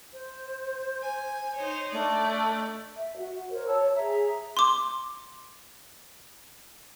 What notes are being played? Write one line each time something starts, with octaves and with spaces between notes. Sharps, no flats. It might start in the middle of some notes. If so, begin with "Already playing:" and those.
C5
G#5
D#4 C5 C#5
A3 D4 D5 D#5
E5
F#4
F#4 A#4 C5 C#5
C#5 A5 E6
G#4 E5 A#5
C6 D6